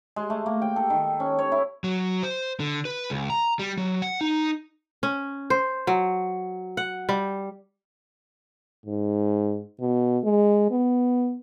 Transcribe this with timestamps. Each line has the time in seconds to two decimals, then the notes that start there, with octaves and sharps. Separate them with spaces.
0.16 G#3
0.30 A3
0.46 A#3
0.62 G5
0.76 A4
0.90 D#3
1.20 C#4
1.39 C#5
1.52 E4
1.84 F#3
2.23 C5
2.60 D3
2.85 B4
3.10 C#2
3.30 A#5
3.59 G3
3.78 F#3
4.02 F#5
4.21 D#4
5.03 C#4
5.50 C5
5.87 F#3
6.77 F#5
7.09 G3
8.86 G#2
9.81 B2
10.24 G#3
10.71 B3